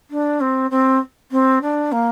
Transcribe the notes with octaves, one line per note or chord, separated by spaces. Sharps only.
D4
C4
C4
C4
D4
A#3